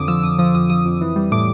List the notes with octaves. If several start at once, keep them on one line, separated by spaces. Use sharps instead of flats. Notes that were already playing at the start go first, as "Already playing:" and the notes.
Already playing: F2 D3 D6 D#6
F3 E6
F2 D#6
F3 D#6
F2 D#6
F3 D#6
F2
E3
G3
A2 D6